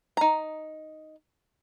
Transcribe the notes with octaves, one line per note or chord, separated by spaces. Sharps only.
D#4 A#5